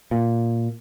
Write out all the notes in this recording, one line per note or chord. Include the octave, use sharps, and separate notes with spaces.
A#2